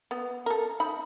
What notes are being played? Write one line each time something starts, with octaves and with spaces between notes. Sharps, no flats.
B3
A4 A#4
D#4 B5